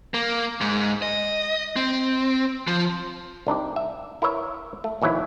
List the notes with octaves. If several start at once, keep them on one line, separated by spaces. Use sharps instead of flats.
A#3
G#2
D#5
C4
F3
C2 D4 D#4 G4
E5
E4 A#4 B4 C#5 E5
A3
A#1 D#2 E3 F#3 E4